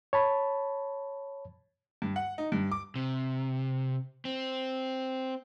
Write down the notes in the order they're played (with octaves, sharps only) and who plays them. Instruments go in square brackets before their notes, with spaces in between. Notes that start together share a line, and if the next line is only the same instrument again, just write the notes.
[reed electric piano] C#5 A5 B5
[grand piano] G2
F#5
D#4
G2
D6
[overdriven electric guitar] C3
C4